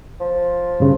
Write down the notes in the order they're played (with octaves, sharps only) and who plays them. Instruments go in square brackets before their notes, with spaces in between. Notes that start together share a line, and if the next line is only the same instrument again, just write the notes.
[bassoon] F3
[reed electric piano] G2 C#3